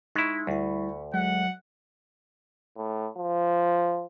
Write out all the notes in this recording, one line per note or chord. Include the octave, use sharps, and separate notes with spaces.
G#3 D#4 E4 B5 C#6
D2 G3 E4
F#3 G#3 F#5
A2
F3